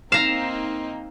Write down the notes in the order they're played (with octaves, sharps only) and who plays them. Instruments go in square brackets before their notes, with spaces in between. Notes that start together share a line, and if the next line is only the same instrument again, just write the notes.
[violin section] A#3 C4 D#4 [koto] F5 A#5 [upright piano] E7